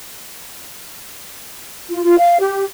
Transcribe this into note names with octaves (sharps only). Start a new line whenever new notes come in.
F4
F4
F5
G4